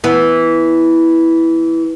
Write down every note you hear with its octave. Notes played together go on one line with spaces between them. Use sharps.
E3 B3